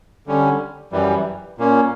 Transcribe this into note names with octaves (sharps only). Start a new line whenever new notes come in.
D3 G3 C#4
F#2 E3 G3
A#2 A#3 C#4